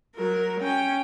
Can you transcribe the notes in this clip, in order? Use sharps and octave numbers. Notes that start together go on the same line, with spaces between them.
F#3 A#4
C#4 G5